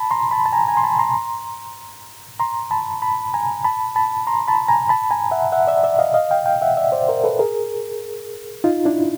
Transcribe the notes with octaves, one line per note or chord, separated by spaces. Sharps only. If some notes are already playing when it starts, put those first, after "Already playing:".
Already playing: A5 B5
A#5 C6
A5 B5
A5
G#5 A#5
G#5 A#5
C6
A5 B5
A#5 C6
A#5 C6
A5 B5
A5 B5
G#5 A#5
A5 B5
A5 B5
A#5 C6
A5 B5
G#5 A#5
A5 B5
G#5 A#5
E5 F#5
E5 F#5
D5 E5
D5 E5
D#5 F5
D#5 F5
F5 G5
F5 G5
E5 F#5
D5 E5
C5 D5
A#4 C5
A4 B4
G#4 A#4
D#4 F4
D4 E4